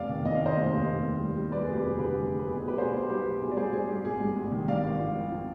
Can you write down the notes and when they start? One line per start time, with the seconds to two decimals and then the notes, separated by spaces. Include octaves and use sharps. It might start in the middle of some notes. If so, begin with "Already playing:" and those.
Already playing: F1 D5 F5
0.09 D#3
0.25 F1 D#5
0.35 F5
0.41 D#3 C5 D#5
0.57 F1
0.72 D#2
0.88 D#2
1.04 D#3
1.20 G3
1.36 G3
1.52 G3 B4 D5
1.62 G#4
1.67 F1
1.72 G4 B4
1.83 F1 G#4
1.99 D3 G4 B4
2.14 G3 G#4
2.31 F2
2.39 B4
2.46 B1 G#4
2.57 G#4
2.62 B2
2.68 G4 B4
2.78 B2 G#4 C5
2.94 B1
3.09 G3 G4 B4
3.26 B1
3.41 B2 G#4
3.51 D5
3.57 G3 G#4 C5
3.73 G2 G#4
3.89 G3 G4
4.05 G#1 G#4
4.20 G2
4.36 G#1
4.52 D#3
4.68 G2 D5 F5
4.84 G#1
4.99 F3
5.15 F2
5.31 F3